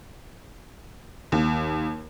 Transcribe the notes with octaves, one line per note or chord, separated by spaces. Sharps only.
D#2